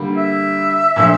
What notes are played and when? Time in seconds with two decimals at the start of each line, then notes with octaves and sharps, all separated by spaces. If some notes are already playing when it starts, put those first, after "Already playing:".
Already playing: D3 G3 A#3
0.17 E5
0.96 A#2 F3 A3 D4